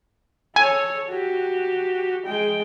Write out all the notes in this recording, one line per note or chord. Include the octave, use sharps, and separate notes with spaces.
A4 C#5 G#5
F#4 G4
G#3 G5